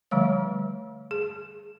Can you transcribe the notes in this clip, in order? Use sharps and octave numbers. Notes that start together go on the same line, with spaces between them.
D3 F3 G3 A3 C#5
G#4